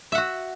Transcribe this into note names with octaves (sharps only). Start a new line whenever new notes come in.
F#4 E5 F#5